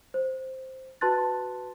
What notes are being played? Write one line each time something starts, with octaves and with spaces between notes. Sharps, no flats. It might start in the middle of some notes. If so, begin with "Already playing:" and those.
C5
F#4 B4 A5 C6 F#6 A6